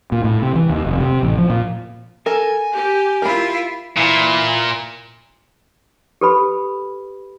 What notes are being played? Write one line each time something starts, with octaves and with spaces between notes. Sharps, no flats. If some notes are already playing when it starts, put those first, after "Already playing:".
A#2
A2
C3
E3
D#2
F1
C3
A1
F3
A#2
A4 A#4 G#5
G4
E4 F4 A#4 B5
A#2 E3
G4 A4 B4 B5